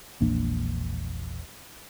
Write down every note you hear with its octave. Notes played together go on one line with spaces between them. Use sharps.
E1 A#1 A#3 D4